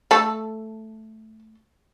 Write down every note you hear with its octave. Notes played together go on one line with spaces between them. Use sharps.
A3 A4